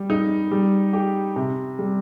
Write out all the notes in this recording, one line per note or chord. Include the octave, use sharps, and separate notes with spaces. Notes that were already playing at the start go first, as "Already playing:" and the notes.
Already playing: G3
D#4
G3
G4
C3
G3